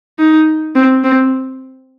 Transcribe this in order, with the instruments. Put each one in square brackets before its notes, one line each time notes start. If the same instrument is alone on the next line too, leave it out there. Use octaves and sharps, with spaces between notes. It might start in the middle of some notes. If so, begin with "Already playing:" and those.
[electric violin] D#4
C4
C4